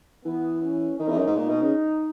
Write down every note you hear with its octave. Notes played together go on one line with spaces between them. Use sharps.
E3 B3
C#4
D#3 D#4
E2
F#2
G#2
A#2 D#4
B2
C#3